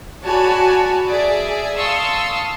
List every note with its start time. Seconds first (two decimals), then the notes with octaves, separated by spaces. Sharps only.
0.23 F#4 C#5 D5 G#5 A5 B5
1.06 G#4 D5 E5
1.76 F5 A5 C6 C#6 D#6 E6